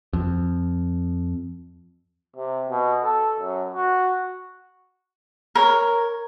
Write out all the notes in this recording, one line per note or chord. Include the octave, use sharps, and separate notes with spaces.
F2
C3
B2
A4
F#2
F#4
A#4 C#5